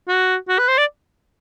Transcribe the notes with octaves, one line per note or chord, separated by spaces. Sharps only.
F#4
F#4
B4
C5
D5